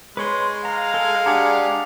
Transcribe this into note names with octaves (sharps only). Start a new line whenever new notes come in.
G#3 B4 C#5 C6
F5 A#5
G#4 A4
D4 G4 G#4 D5 F#5 A#5